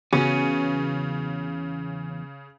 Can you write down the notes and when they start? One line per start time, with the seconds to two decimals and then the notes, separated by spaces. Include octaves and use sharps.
0.13 E2 C#3 B3 C#4 F#4